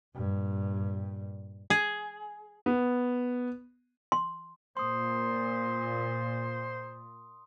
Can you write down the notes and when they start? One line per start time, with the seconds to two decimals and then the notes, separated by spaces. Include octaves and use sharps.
0.15 G2 A#2
1.70 G#4
2.66 B3
4.12 C6
4.77 A#2 C5 C6 D#6